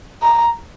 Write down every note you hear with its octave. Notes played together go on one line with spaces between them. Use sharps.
A#5